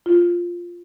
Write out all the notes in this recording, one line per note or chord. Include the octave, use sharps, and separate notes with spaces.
F4